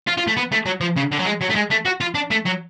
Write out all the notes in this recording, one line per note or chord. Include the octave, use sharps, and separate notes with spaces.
F4
F4
A3
B3
A3
F#3
F3
C#3
D3
F#3
G#3
F#3
A3
G#3
A3
F#4
F4
D4
A3
F#3